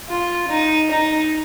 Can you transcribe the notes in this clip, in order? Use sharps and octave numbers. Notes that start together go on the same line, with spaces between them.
F4
D#4
D#4